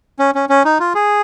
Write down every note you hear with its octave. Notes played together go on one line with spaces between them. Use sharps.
C#4
C#4
C#4
D#4
F4
G#4